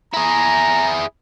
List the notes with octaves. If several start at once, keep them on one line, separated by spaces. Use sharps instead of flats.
E4 G#4 A#5